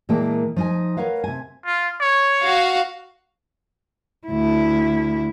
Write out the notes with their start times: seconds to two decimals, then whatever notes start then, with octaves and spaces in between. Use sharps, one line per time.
0.09 A#2 E3 G#3 A#3 G5 A5
0.56 F3 D#4 G#5
0.97 A#4 B4 C#5 F5 F#5
1.24 C3 G#5
1.66 F4
2.00 C#5
2.42 F#4 F5
4.27 D2 E4